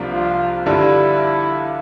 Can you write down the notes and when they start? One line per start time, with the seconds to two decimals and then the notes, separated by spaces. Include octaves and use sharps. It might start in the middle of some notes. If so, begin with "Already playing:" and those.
Already playing: C2 C3 F3 A#3 D4
0.14 F4
0.66 G2 D3 G3 D4 E4 F4